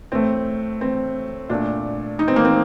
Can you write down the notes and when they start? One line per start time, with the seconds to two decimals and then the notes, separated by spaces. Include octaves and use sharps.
0.12 A2 A3 C4
0.81 C4
1.49 A#2 A3 D4
2.19 D#4
2.28 C4
2.36 A#3
2.45 C4